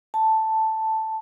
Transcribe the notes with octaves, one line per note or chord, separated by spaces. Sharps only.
A5